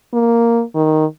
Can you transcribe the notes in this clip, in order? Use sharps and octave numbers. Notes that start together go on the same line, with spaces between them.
A#3
D#3